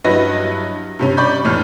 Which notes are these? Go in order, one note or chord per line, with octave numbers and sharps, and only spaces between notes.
G2 F#3 E4 B4 D#5 A#6
G2 C3 C#4
D5 B5 C#6 G6
F1 A2 E3 D4 F6